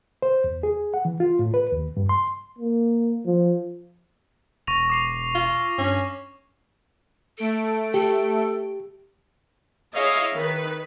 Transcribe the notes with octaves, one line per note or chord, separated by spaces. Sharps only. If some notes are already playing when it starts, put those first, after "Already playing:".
C5
E2
G#4
F#5
E3
F4
A2
B4
D#2
G2
C6
A#3
F3
E1 C#6 A#6 F7
D6 C7 F7
F4
G2 C#4
A3 A4 D7
G4 A4
E4 G#4 C#5 D#5 F5
D#3 B4